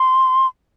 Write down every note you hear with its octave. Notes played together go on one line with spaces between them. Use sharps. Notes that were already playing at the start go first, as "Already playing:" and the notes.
Already playing: C6